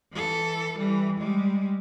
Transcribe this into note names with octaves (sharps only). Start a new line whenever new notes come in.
E3 A4
E3 G3
G3 G#3